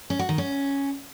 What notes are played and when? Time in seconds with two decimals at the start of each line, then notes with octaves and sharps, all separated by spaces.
0.10 C#4
0.19 F#4
0.29 D#3
0.38 C#4